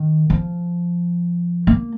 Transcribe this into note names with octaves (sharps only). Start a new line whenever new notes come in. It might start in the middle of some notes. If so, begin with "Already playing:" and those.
Already playing: D#3
F3
A#3